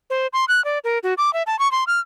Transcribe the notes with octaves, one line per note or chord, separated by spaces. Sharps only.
C5
C6
F#6
D5
A#4
F#4
D6
E5
A5
C#6
C6
F6